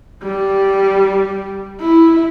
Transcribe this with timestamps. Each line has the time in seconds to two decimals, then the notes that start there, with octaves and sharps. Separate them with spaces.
0.23 G3
1.80 E4